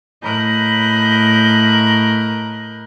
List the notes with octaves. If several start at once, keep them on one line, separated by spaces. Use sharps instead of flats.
A2 A#4 D#5 B5 F#6 G6